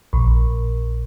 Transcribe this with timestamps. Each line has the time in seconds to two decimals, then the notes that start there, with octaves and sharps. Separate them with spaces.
0.13 A#1